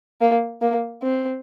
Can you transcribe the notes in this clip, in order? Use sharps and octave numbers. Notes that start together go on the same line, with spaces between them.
A#3
A#3
C4